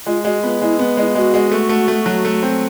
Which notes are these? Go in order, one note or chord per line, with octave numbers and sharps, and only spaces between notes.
G#3 F4
G#3 F#4
B3 F4
G#3 E4
B3
G#3 E4
F4
G#3 F#4
G#3
A3
A3
A3
F#3
A3
C4